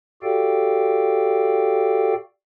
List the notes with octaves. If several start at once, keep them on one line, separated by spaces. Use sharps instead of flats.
F#4 G4 A4 D5 F5 G5